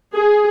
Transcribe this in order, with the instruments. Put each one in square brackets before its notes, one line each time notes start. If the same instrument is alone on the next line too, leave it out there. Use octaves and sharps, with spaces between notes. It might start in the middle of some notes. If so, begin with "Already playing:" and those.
[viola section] G#4